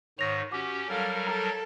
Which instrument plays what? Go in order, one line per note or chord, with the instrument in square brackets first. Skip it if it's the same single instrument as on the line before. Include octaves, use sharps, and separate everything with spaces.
[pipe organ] G#2 D#3 [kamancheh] C#5 [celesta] A#6 F7
[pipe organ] C#4 G4 [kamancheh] F#4 [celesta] D6
[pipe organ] F#3 G3 A#4 [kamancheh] A4 F5
[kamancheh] A4 [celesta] A#5